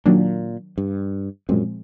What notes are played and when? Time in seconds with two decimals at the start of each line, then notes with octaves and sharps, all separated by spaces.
0.06 A#2 D#3 F#3 A#3 D4
0.78 G2
1.49 F#2 A#2 F3 G#3 C4